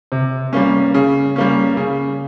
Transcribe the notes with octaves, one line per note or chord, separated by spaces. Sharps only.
C3
G3 A#3 C#4
C#3
G3 A#3 C#4
C#3